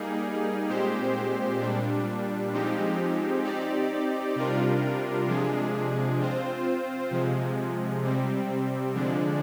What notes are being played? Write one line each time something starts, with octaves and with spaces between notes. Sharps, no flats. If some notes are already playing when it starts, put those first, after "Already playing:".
Already playing: G3 A#3 D#4 G#4
A#2 G#3 C4 G4 C5
A#2 G3 D4
F3 G#3 C4 D#4 G4
C4 D#4 G4 D5
C3 G3 D4 F4 A#4
C3 F3 G#3 D4 G#4
C4 F4 C5
C3 F3 G#3
C3 G3 C4
D3 F3 G#3 D4